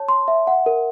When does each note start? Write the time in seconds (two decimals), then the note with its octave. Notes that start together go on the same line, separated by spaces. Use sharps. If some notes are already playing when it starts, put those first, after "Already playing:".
Already playing: C#5 A5
0.09 C6
0.28 E5
0.47 F#5
0.66 A#4